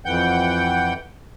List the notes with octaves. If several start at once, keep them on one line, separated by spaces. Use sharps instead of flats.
F2 E3 F#5 G5 G6